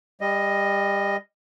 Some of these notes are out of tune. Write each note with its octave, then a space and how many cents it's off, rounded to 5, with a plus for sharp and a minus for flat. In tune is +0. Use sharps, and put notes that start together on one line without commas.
G3 +25 D#5 +0